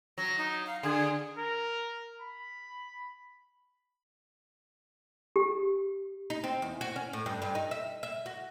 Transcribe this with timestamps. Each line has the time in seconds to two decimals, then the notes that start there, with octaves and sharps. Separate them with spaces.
0.18 F#3 A#6
0.38 D#4
0.66 F5
0.83 D3 G#4
1.38 A#4
2.21 B5
5.36 G4
6.30 D#4
6.44 C4
6.62 E2
6.81 F#4
6.96 C#4
7.13 A2
7.26 G2
7.42 G2
7.55 D#4
7.71 E5
8.03 E5
8.26 F#4